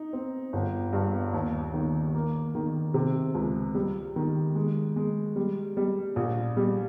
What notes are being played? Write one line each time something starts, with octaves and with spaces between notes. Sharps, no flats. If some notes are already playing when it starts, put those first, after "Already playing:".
Already playing: D#4
C4
G1
G2
D#2
D#3
A#3
D#3
C3
C#2
G3
D#3
G#3
G#3
G3
G3
A#1
G3